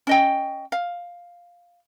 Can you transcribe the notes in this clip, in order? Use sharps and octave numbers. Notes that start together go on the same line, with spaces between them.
C#4 D#5 G5
F5